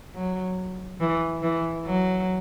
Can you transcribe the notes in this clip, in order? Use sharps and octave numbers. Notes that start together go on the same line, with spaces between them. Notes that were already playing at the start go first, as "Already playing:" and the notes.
F#3
E3
E3
F#3